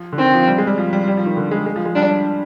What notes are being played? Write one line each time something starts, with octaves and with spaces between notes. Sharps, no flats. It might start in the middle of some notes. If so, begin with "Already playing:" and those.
Already playing: F3
D3
D#3 C4
F3
G3
G#3
G3
F3
G3
G3
F3
D#3
D3
G#3
G#3
F3
G#3
G3 D4